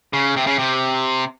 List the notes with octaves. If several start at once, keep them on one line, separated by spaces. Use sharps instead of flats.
C#3
C3
C#3
C3